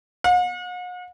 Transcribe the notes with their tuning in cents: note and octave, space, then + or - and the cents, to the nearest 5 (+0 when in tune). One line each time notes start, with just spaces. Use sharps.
F#5 -45